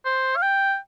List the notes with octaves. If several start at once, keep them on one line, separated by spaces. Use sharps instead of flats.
C5
F5
G5